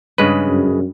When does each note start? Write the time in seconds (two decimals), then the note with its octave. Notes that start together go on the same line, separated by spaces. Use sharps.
0.18 G2 C#3 G#3 B4
0.48 F#2